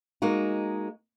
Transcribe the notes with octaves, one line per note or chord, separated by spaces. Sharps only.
G#3 A#3 D#4 F#4